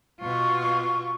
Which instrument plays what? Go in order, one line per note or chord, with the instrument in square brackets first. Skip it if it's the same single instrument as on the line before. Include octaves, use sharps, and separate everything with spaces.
[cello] B2 F4 [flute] C#6